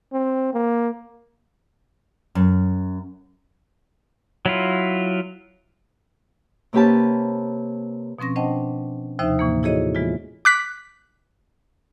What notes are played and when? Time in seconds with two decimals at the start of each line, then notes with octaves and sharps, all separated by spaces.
0.13 C4
0.54 A#3
2.35 F#2
4.46 F#3 E4 F4
6.73 C3 A#3 C#4 G4 B4 A5
8.19 B2 F3 C4 C#4 A#6
8.36 D4 C5 D#5 F#5 G5 A5
9.19 D#2 C3 F3 D#4 C5 E5
9.39 A2 E3 A#3
9.63 E4 F#4 G#4 A4 C#5 D#5
9.95 E3 G#3 B3 F4
10.45 D6 F#6 B6